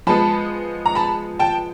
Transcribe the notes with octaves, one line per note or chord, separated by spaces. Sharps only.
F3 G#3 B3 A5 B5
A#5
A5 B5
G5 A5